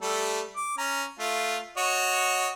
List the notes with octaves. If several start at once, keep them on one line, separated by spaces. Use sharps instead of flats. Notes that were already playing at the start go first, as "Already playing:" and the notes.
G3 A3 A4
D6
C#4 A#5
A3 F4
F#4 C#5 D#5